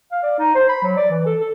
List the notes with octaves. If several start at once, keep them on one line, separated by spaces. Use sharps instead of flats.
F5
D5
D#4
C5
B5
F#3
D5
E3
A4
A4